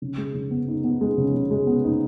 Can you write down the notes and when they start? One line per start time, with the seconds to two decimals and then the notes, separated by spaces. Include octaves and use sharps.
0.02 C#3
0.17 G#3
0.34 C#3
0.51 B3
0.68 D#4
0.84 B3
1.01 G#3
1.18 C#3
1.35 C#3
1.51 G#3
1.67 B3
1.84 D#4